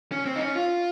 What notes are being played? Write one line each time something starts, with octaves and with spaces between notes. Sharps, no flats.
C#4
C4
D#4
C#4
F4